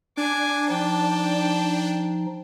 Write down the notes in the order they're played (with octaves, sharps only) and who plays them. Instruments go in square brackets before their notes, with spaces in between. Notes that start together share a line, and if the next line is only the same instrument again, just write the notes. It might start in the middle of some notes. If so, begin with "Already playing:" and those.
[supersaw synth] D4 [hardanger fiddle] G#5 D6
[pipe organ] F3 D#4 [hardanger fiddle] G5 A5